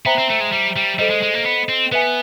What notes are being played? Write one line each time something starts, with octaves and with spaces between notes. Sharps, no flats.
B3 C5 E5 G5 A#5
C4
A3
G#3
G3
G3
G3 A4 C5 D#5
G#3
G#3
A#3
B3
C4
B3 B4 E5 G#5